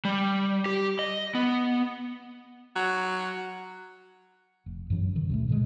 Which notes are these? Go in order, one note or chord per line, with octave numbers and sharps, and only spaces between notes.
G3
G4
D#5
B3
F#3
F1
F#2 E3 F#3
C3 D#3
D2 B2 A3
A#2 D3 D#3 G#3